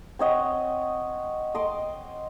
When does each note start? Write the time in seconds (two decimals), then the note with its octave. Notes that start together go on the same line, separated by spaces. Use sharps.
0.19 C4 C#5 D#5 F#5
1.55 D#5 C6 D6